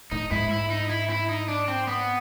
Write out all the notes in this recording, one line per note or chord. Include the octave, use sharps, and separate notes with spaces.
A2 D#4
G#2 E4
E4
D#4
E4
E4
D#4
D4
C4
B3